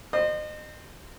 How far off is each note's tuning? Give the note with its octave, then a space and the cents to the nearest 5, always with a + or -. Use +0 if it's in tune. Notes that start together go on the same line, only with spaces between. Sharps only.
C5 +0 D#5 -35